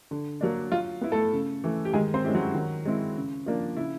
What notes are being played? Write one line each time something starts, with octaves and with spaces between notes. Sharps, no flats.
D3
F#3 A#3 D4
F#3 F4
B3 E4
A3 A4
C#3
E3 A3
G4
D#3 G#3 G#4
C4 C5
G#3 C#4 E4 G4
F#3 F#4
D#3
G#3 C4 E4
C#3
F3 A#3 D4
C#3 E4